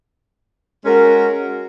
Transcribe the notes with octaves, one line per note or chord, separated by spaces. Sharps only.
G#3 C#4 F#4 A#4